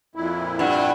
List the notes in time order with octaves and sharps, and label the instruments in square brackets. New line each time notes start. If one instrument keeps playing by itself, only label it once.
[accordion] F2 A#2 E4
[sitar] G2 [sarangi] F#5